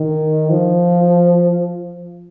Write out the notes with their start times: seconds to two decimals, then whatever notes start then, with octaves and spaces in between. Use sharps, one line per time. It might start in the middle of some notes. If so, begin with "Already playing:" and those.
Already playing: D#3
0.50 F3